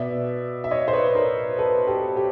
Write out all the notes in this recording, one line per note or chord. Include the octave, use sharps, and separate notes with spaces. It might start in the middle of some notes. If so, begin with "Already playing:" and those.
Already playing: B2 D5 E5
E5
C#5 D#5
C5
B4 C#5
A#4 C5
A4 B4
G4 A4
G4